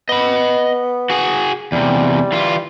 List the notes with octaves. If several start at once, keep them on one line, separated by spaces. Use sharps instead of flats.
B3 D#5 B5
F#4 G#4
E2 C3 G3
E3 F4